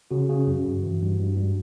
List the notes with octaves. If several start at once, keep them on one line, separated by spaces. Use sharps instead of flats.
C#3 F#4
C#3
F#2
G2
E3
G2
G2
G2